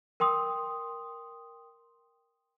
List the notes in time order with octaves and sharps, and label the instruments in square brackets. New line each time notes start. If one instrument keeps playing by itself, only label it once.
[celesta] A#4 G5 C6 D#6